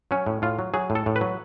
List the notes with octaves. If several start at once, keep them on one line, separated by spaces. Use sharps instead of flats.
F#3 C#4
A2
A2 F4
F#3
F#3 G#4
A2
A4
A2
B4
F#3